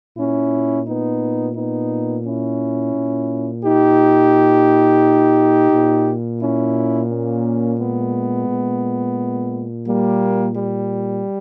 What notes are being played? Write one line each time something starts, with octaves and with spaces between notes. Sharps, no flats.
A#2 C#4 E4
B3 D#4
B3 D#4
C#4 E4
A#2
D#4 G4
A#2
C#4 E4
A#3 C#4
G#3 B3
A#2
G3 A#3
G3